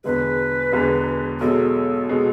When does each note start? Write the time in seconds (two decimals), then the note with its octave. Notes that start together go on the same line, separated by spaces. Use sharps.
0.04 E1 E2 D3 G#3 B4
0.72 E1 E2 D3 G#3
1.40 B1 B2 G#3 A4
2.09 B2 G#3